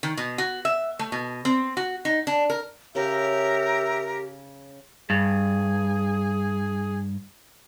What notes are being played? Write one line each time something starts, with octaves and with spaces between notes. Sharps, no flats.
D#3
B2
F#4
E5
A3
B2
C4
F#4
D#4
D4
A#4
C#3 G4 A#4 E5
G2 G#4